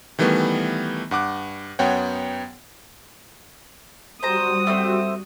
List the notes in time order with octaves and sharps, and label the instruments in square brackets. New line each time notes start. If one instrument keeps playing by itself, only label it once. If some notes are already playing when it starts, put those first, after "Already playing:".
[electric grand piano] D#3 E3 G3 A3 B3
G2 F#5 D6 F#6
F#2 B3 C#5 F#5 G5
[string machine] G3 F#4 [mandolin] C5 A#5 [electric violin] D#6
[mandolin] A3 C4 C5